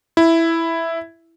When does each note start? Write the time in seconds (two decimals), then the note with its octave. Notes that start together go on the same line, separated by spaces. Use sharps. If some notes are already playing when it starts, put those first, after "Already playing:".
0.17 E4